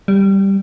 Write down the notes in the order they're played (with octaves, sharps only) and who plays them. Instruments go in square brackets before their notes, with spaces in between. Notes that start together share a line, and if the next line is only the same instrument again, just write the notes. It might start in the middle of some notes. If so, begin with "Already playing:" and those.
[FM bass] G3